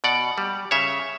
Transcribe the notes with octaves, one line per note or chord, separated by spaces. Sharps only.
B2 D5 F#5
G3
C#3 C#5 E5